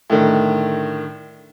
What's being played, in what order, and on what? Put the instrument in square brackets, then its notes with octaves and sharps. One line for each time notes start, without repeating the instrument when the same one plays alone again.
[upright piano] A2 D3 D#3